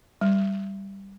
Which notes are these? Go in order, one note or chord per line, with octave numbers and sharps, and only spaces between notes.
G3